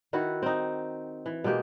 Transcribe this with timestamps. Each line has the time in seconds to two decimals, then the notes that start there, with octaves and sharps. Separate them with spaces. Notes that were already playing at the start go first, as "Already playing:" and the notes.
0.13 D#3 E4 F#4 B4
0.42 C4 D#4
1.26 E3
1.44 B2 G#3 A#3 G4